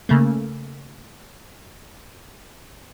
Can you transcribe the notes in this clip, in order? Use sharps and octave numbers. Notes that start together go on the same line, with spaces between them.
C#3 A3 A#3